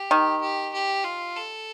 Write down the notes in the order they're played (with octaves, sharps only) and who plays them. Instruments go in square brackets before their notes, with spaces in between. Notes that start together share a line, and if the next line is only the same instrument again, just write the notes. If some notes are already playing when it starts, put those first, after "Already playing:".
Already playing: [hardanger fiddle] G4
[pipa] D#3
[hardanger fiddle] G4
G4
F4
A4